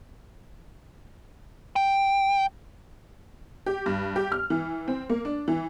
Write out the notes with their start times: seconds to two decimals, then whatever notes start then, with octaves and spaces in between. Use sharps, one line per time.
1.76 G5
3.66 G4
3.86 G2
4.16 G4
4.32 F6
4.50 E3
4.88 C4
5.10 A#3
5.25 D4
5.48 E3